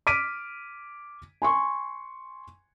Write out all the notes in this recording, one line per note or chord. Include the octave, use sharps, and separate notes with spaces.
D6 F6 B6 D7 D#7
G#5 C6 C#6